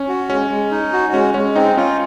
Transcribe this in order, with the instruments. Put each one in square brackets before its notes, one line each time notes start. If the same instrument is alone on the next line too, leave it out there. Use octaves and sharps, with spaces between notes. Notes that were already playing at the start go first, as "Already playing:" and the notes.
Already playing: [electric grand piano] C#4
[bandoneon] F#4
[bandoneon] G#3 [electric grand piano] C#4
[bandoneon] G#3
D#4
F#4
[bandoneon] G#3 [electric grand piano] C#4
[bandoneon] G#3 [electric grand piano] C#4
[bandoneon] C4 [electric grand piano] D#4
[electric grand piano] C#4 [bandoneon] F4